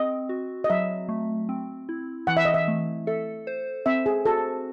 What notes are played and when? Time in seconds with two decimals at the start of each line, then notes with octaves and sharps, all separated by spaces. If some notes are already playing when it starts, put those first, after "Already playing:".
Already playing: C4 D#5
0.29 F#4
0.64 D#5
0.70 F#3 E5
1.09 A3
1.49 C4
1.89 E4
2.27 E3 F#5
2.37 E5
2.45 D#5
2.54 E5
2.68 A3
3.07 A4 E5
3.47 C5
3.86 C4 E5
4.06 G#4
4.26 F#4 A4